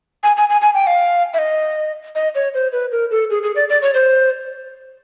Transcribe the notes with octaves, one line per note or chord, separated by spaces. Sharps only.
G#5
G#5
G#5
G#5
G5
F5
E5
D#5
D#5
C#5
C5
B4
A#4
A4
G#4
G#4
D5
D5
C#5
C5